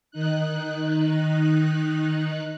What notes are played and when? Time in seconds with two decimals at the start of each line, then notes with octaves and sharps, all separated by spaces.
0.11 D#3 D#4 F#6